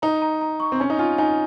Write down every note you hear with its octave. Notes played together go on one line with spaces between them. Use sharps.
D#4 A#5
A#5
A#5
C#6
C4
C#4 G#5
D#4
F4 G#5
D#4 G#5